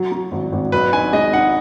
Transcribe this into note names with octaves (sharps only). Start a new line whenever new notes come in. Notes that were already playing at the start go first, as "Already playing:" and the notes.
Already playing: F#3
F#3
G#1
G#1
B1 B4
D#4 G#5
G#3 D#5
D#4 F#5